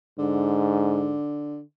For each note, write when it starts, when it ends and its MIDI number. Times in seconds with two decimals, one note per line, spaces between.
0.19 1.16 44
0.19 1.60 50